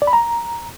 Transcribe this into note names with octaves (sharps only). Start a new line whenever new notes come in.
D5
B5
A#5